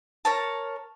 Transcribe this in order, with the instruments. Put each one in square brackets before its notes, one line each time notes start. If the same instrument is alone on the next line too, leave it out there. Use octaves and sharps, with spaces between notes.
[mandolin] A#4 C#5 A5